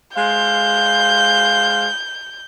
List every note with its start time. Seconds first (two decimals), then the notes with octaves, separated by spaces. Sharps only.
0.16 G#3 C5 F5 G6